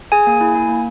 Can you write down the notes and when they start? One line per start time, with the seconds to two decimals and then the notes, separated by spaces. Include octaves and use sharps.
0.12 G#4 G#5
0.27 A#3
0.41 E4
0.55 A#3
0.69 A#3